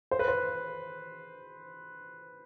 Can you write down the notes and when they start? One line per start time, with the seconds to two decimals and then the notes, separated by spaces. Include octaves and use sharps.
0.11 C5
0.19 B4
0.28 C5